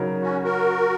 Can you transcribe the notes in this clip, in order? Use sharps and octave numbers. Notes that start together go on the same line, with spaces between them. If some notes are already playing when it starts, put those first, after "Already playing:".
Already playing: C#3 F#3 D#4 A#4
C#4 F#4
F#4 A#4